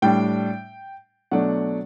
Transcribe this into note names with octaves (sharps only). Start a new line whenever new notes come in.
A2 G3 D4 G5
B2 F#3 A3 D4 F#5